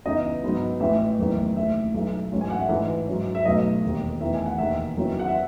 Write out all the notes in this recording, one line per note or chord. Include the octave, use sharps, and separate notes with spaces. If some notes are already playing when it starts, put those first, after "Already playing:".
C#2 C#3 E3 B3 D#4 D#5
G#2 F#3 B3 D#4
A1 A2 E3 G#3 E5
F#1 E2 D#3 A3
D#2 C#3 E3 A3 E5
B1 B2 G#3 D#4
A1 G#2 F#3 C#4
G#5
F#5
E5
A1 G#2 E3
G#2 F#3 C#4
E5
B1 B2 A3 D#4 D#5
E1 D#2 D#3
E2 D#3 A3 E5
G#5
F#5
E1 D#2 D#3 G#3 E5
F#1 E2 D#3 F#3 C#4
F#5
E5